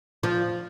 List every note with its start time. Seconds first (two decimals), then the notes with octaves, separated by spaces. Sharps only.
0.23 F3